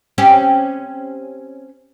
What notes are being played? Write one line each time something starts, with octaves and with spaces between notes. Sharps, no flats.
C4 C#4 G4